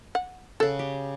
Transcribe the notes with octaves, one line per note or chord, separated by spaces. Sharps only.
F#5
C#3 A4 F#5
G4